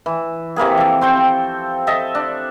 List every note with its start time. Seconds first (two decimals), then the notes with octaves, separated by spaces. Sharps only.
0.06 E3
0.56 C3 E3 A#3 G#4
0.77 F3 A4
1.01 C4 C5 G5 C#6
1.87 A4 D#5 E5 A5
2.15 D4